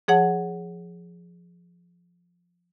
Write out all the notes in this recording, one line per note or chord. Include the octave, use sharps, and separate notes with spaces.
F3 G#4 C#5 F#5 A5